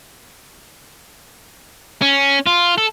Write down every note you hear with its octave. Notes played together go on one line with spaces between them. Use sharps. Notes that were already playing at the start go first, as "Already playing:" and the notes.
C#4
F4
A4